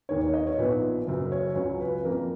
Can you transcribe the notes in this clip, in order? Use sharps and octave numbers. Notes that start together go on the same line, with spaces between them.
D#2 D#3 A#3 D#4 C#5
C#5
D#5
C#5
A#1 A#2 F3 B3 D#4 B4
F#1 F#2 C#3
C#5
C#2 C#3 F#3 C#5
B4
F2 F3 A#3 A#4